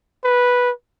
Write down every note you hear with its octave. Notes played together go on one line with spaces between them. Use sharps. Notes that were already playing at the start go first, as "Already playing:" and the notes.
B4